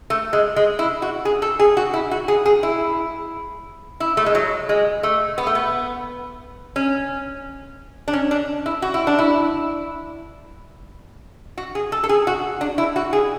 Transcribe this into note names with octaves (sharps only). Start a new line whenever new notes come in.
A3
G#3
G#3
E4
F#4
G#4
A4
G#4
F#4
E4
F#4
G#4
G#4
E4
E4
A3
G#3
F#3
G#3
A3
B3
A3
B3
C#4
D4
C#4
D4
E4
F#4
E4
D4
E4
F#4
G#4
A4
A4
G#4
F#4
D4
E4
F#4
G#4